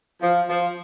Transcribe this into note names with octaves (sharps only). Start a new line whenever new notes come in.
F3
F3